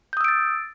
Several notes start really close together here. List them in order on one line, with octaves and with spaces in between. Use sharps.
G6 D#6 E6 D7 A6